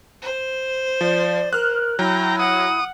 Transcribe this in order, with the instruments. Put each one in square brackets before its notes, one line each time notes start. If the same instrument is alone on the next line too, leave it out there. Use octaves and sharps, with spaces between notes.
[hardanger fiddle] C5
[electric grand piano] F3 [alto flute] D5
[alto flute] A#4 [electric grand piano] F6 F#6
[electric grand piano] F#3 [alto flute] E4 [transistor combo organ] G5 A#5
[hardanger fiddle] F#5 [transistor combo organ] D#6